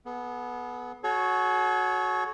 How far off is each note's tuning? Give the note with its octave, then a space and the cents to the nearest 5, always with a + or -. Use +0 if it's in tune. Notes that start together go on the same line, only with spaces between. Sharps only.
B3 -10 G#4 +45
F#4 +0 A4 -45 C#5 +0